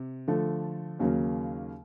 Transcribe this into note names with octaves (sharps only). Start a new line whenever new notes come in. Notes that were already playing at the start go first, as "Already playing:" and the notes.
Already playing: C3
D3 F3 A3
D#2 C#3 F#3 A#3